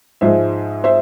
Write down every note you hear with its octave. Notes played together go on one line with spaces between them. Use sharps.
G#2 F3 G#3 C5 E5
C5 E5